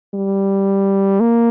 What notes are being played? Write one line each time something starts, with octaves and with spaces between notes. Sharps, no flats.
G3
A#3